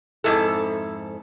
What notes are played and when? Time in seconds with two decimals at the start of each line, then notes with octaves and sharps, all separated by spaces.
0.24 F2 G#2 E4 A4